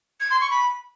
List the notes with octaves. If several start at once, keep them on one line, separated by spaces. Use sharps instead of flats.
G#6
C6
C#6
B5